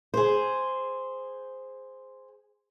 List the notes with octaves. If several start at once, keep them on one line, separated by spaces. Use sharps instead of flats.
G#4 C5